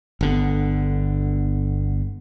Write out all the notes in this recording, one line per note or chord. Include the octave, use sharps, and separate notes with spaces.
G1 D3 B3